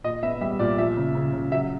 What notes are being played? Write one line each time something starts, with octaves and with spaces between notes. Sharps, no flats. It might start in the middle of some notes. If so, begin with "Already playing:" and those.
A#2 D#5
B3 E5
G3 E5
A#2 D5
F3 E5
C#3
C#3
C#3
F#3 E5